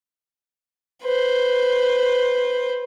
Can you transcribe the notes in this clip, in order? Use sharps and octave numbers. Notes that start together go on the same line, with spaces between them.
B4 C5